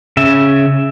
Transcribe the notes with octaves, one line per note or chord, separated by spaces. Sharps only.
C#3 E5